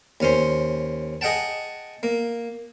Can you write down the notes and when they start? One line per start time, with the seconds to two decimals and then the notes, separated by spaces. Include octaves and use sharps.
0.20 D#2 C#4 C5
1.21 G#4 D#5 F#5 G5 A5
2.03 A#3